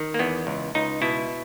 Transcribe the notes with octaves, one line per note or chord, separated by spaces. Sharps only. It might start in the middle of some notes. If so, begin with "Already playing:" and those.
Already playing: D#3
A#3
E2 B3
C#2
C#2 D#4
B2 E4